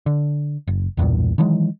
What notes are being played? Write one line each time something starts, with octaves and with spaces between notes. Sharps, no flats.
D3
F#1
B1 E2 G2 A#2
D#3 E3 F#3 G#3